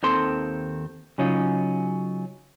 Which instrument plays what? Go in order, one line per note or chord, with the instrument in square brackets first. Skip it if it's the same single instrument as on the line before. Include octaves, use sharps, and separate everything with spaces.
[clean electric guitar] D#2 D#3 C4 A4 C6
C#3 F#3 C#4 D#4 F4